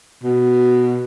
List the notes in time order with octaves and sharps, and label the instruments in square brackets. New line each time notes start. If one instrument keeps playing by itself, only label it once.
[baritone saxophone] B2